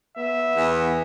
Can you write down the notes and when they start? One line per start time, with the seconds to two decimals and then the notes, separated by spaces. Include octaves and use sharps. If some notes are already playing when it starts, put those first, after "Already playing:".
0.17 B3 E5
0.55 E2